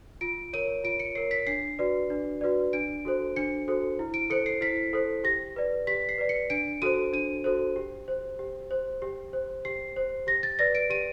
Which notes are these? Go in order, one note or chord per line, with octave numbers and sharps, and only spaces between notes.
F4 D7
A#4 C#5 D#7
F4 D7
C#7
A#4 C#5 C7
B6
D4 C7
F#4 B4 D5
D4
F#4 B4 D5
D4 D7
F#4 A4 C5
D4 C#7
F#4 A4 C5
E4
D7
A4 C5 C#7
C7
E4 B6
A4 C5
G4 A#6
B4 D5
G4 B6
C7
B4 D5
C#7
D4 D7
F#4 A4 C5 D#7
D4 D#7
F#4 A4 C5
G4
C5
G4
C5
G4
C5
G4 C7
C5
G4 A#6
A6
B4 D5 A#6
D7
G4 D#7